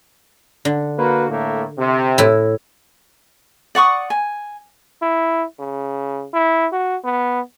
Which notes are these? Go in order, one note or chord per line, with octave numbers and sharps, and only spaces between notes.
D3
A#3 F#4 B4
A2 A3 A#3
C3
A2 E4
D5 F#5 C#6 D#6
G#5
E4
C#3
E4
F#4
B3